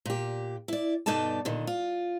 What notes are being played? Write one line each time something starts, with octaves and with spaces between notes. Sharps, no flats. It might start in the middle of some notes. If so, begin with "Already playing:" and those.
A#2 G4
E4 D5
G2 B2 D#4 A4 D5 A5
A#2 D3 D#3
F4